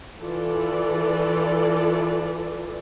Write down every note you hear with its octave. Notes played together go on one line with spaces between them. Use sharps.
E3 F4 A4 B4 D5